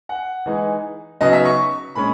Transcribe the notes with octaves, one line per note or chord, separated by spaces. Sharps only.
F#5
E3 G#3 D#4
C#3 F#3 B3 D#4 D#5
E5
C#6
A#2 G#3 C#4 B5